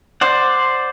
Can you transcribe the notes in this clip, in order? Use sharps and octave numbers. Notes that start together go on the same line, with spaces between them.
C5 D5 F#5